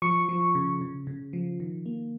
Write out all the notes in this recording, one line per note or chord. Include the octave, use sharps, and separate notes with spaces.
F3 C#6
F3
C#3
C#3
C#3
F3
D#3
A#3